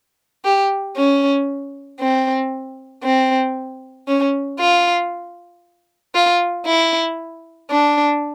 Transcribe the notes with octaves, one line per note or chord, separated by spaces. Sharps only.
G4
C#4
C4
C4
C#4
F4
F4
E4
D4